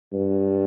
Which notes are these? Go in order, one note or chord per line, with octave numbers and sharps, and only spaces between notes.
G2